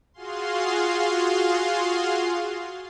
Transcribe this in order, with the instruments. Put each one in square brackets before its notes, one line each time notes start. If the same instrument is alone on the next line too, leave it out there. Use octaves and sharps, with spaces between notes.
[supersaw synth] F4 F#4 G#4 F5 C6